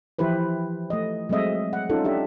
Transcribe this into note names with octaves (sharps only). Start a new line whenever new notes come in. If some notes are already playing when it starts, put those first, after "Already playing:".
E3 F3 E4 G4 B4 C5
A3 D#5
F#3 G#3 A3 C4 D#5 E5
F#5
C#4 D#4 F4 A4
D4 G4 E5